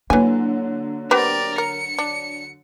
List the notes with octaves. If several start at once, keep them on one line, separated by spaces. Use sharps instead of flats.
D3 E3 F#3 A#3 G#5
B3 C4 G4 A#4 D5
A#4 C#7
D4